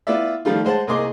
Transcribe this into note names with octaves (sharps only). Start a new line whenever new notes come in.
B3 E4 F4 D5 E5
D#3 F3 G3 A3 F4
G#3 C5 F#5 A5
C2 A#3 G#4 D#5 C6 D6